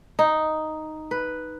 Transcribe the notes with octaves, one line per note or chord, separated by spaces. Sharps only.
D#4
B4